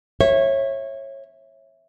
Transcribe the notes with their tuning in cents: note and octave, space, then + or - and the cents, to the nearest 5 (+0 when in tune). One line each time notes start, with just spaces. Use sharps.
C#5 -25 E5 +0